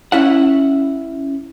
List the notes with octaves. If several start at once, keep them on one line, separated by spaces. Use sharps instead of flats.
C#4 E4 F#5